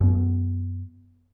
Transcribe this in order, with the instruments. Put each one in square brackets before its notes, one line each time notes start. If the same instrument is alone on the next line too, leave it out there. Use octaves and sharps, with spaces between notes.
[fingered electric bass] F#2 B3